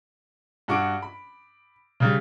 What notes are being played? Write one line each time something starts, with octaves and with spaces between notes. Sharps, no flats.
G2 F#4 C#6 D6 D7
B5
C#3 G3